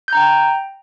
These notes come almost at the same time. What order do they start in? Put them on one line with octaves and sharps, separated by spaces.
G6 A#5 G5